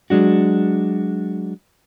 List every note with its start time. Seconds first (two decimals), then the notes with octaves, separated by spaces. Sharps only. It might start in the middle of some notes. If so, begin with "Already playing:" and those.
0.10 F#3 G#3 D4 F#4